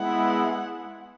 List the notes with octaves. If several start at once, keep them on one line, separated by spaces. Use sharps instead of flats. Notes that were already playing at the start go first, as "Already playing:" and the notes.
Already playing: G#3 B3 E4 F#5